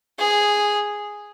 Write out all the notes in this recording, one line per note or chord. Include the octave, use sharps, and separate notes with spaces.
G#4